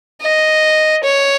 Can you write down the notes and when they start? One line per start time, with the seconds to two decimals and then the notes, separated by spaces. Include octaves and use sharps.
0.21 D#5
1.04 C#5